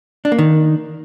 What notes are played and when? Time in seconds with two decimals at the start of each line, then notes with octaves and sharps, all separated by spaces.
0.25 D4
0.32 A#3
0.39 D#3